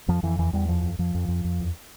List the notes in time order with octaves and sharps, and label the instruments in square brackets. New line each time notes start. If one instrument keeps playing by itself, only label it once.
[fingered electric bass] F2 F3
F2 E3
E2 E3
E2 G3
F2 F3
F2
F2 F3
F2
F2
F2
E2